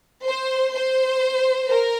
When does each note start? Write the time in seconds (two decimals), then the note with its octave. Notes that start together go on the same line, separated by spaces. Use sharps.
0.24 C5
0.72 C5
1.68 A#4